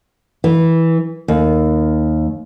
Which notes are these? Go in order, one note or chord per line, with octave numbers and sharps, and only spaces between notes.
E3
D#2